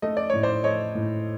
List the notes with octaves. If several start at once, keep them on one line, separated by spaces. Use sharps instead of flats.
A3 D#5
D5
A2 C#5
C5 D5
A3 C#5 D#5
A2